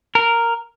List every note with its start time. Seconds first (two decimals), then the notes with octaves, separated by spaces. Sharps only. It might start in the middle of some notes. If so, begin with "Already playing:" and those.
0.15 A#4